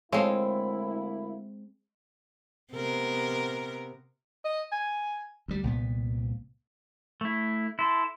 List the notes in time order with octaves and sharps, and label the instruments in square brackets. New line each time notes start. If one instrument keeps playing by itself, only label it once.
[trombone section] D2 A#3 E4 [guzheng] G#3 C4 [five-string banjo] A4 C#5 F5
[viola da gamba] C3 B3 A#4
[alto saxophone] D#5
G#5
[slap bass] D2 G3
C2 A#2 B3
[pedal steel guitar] A3 E4
[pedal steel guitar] E4 A4 [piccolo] C6